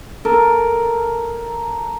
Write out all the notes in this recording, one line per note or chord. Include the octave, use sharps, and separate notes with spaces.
A4 A#4